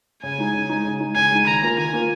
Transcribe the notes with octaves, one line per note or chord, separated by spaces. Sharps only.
C#3 G#5
G#3 D#4
C#3
G#3 D#4
C#3
G#3 D#4
C#3 G#5
G#3 D#4
D#3 A#5
A#3 F4 A#4
D#3 G#5
A#3 F4 A#4